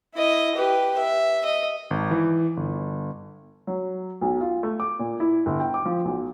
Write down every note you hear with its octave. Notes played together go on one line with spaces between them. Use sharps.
E4 D#5
G4 B4
E5
D#5
G#1
E3
G1
F#3
B1
F4
A3
D6
A#2
E4
G1
G5
D6
F3
B1